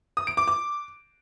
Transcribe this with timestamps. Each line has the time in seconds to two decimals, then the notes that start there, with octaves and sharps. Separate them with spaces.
0.17 D#6
0.27 D7
0.37 D6
0.48 D6